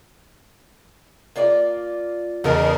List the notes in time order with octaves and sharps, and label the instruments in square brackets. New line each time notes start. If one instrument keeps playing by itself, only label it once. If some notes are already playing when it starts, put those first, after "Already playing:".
[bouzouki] A#3 F4 D5
[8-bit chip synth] E2 C#3 A#4 [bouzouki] F#3 D#4 A4